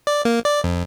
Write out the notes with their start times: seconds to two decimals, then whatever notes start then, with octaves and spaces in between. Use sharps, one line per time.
0.07 D5
0.25 A#3
0.45 D5
0.64 F2